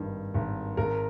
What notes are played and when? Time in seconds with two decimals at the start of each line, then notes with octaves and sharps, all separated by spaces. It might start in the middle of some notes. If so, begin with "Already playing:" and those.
Already playing: G#1 G2 D#3
0.34 G#1
0.77 G#1 A#4